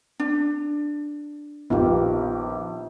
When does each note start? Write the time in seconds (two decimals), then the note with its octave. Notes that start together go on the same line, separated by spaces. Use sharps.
0.20 D4
1.70 A#1 B3 D#4 F4 G4